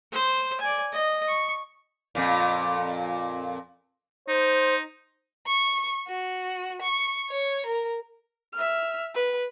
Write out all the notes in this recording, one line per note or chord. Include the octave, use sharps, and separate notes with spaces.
C5
D5 G#5
D#5
C#6
F2 A#2
D#4 C5
C#6
F#4
C#6
C#5
A#4
E5 F6
B4